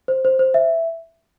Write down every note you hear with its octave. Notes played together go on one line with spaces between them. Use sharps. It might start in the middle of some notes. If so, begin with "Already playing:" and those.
C5
C5
C5
E5